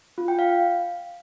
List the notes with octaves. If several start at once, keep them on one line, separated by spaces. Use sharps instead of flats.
F4
G5
F5